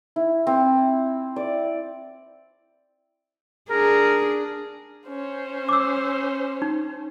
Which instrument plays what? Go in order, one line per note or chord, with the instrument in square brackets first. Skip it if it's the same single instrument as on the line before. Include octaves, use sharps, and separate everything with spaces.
[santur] E4
C4
D5
[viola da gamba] D4 G#4 [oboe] A#4
[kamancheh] C#4 C5
[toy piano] D6 E6
D#4